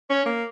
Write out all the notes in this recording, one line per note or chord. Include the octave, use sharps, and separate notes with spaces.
C#4 C#5
A#3